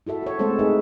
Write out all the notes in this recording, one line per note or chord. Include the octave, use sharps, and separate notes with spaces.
E4 F#4 A4 E5
F#4 C#5
G#3 A3 C4 A4 C5
D#4 G#4 B4 E5